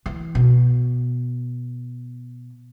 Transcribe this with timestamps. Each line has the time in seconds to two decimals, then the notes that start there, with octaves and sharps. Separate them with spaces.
0.06 E3
0.35 B2